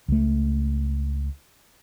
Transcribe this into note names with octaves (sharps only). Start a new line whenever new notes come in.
C#2 A3